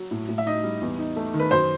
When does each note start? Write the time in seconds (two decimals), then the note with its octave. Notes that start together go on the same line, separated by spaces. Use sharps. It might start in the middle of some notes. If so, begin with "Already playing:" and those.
Already playing: F#3
0.11 A2
0.28 A2
0.38 E5
0.46 D#4 D#5
0.63 G3
0.81 E2
0.99 D#4
1.16 A3
1.34 D#3
1.40 B4
1.51 F#2 C5